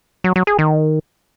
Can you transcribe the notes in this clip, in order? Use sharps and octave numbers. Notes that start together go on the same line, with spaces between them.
F#3
F#3
G#4
D#3